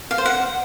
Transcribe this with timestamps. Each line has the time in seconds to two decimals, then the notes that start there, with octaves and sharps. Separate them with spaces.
0.11 F5
0.18 C5
0.26 F#5